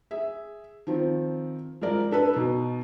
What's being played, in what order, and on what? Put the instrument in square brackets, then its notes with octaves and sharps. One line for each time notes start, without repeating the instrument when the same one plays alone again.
[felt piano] G#4 E5
D#3 F3 C4
F3 G#3 A#4 D5
D4 A4 B4
B2 D#4